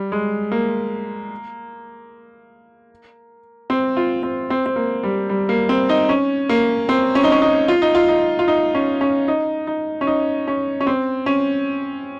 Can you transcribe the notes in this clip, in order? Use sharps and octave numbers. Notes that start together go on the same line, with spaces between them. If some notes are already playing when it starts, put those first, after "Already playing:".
Already playing: G3
G#3
A#3
C4
F4
C4
C4
C4
A#3
G3
G3
A#3
C4
D#4
C#4
A#3
C4
C#4
D#4
C#4
D#4
F4
D#4
F4
D#4
F4
D#4
C#4
C#4
D#4
D#4
C#4
D#4
C#4
C#4
C4
C#4